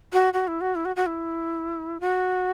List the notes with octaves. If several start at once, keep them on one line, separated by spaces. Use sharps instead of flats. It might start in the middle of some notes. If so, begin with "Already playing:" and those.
F#4
F#4
E4
F#4
E4
F#4
F#4
E4
F#4